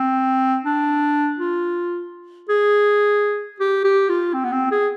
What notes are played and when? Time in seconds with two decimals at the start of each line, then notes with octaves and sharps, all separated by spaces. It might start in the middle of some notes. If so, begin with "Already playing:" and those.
Already playing: C4
0.65 D4
1.39 F4
2.49 G#4
3.60 G4
3.84 G4
4.09 F4
4.34 C4
4.44 B3
4.52 C4
4.71 G#4